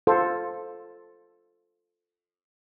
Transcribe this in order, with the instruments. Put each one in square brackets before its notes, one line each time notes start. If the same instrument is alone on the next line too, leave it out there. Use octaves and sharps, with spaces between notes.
[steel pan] F4 A4 C5